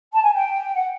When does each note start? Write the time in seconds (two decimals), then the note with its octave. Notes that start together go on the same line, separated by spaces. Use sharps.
0.13 A5
0.23 G#5
0.34 G5
0.75 F#5